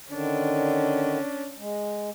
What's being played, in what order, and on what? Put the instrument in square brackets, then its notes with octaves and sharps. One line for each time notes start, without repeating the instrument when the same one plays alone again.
[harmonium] D3 D#3 [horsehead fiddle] C#4 D4
[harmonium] G#3